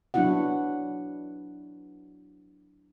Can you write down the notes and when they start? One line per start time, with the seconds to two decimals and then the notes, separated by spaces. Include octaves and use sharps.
0.14 F#3 B3 D4 E4 F#4 F#5